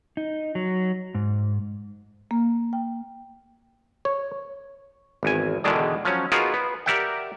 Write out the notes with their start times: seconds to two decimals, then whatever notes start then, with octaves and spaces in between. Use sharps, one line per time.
0.17 D#4
0.55 F#3
1.15 G#2
2.31 A#3
2.73 G5
4.05 C#5
5.23 G#1 E2 G#5
5.64 E2 B2 D3 D#3 G#3 D4
6.05 F3 F#3 C#4
6.32 B3 D#4 F4 F#4 G#4 A#4
6.53 B3
6.86 G4 A#4 D5 E5 F#5 G5